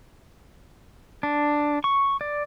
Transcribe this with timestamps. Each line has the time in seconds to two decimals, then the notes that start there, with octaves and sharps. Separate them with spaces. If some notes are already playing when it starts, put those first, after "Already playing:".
1.23 D4
1.84 C#6
2.21 D5